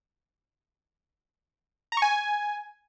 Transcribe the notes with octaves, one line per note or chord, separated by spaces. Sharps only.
A#5
C#6
G#5